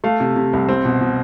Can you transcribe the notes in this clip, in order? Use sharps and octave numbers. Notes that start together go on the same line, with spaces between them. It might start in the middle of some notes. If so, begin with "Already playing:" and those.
A3 F5
C3
C3
C2
C4
B2
B2